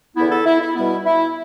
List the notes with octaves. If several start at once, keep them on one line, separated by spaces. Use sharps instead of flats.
E2 D3 B3 E4
E4 A4
E4
E4
B2 G3 B3 E4
E4